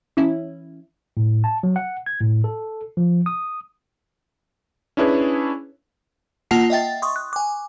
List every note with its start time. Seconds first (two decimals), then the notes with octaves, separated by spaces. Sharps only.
0.17 E3 C#4 E4
1.17 A2
1.44 A5
1.63 F#3
1.76 F#5
2.06 G#6
2.21 A2
2.44 A4
2.97 F3
3.26 D#6
4.97 C#4 D4 E4 G#4 B4 C#5
6.51 A#3 F4 F#5 A5 C7
6.70 D#5 E5 G5 A6
7.02 C6 C#6 D#6
7.16 F#6
7.33 G#5 D6